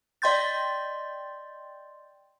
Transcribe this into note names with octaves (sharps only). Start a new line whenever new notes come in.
D5 D#5 G5 C6 G6 A6